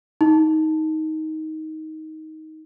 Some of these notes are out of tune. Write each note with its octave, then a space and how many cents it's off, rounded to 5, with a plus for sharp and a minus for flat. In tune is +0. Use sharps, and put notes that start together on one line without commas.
D#4 +15